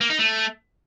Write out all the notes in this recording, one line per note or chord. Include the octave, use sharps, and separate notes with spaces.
A#3
D#4
A3